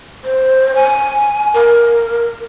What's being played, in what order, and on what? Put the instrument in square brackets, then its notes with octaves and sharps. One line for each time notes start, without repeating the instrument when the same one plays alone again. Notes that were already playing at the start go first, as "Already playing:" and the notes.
[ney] C5
G#5
A#4